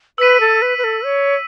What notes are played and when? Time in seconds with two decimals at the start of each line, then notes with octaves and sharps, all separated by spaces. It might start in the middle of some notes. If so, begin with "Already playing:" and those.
0.18 B4 E6 B6 D#7
0.40 A4
0.62 B4
0.78 B4
0.84 A4
1.05 C#5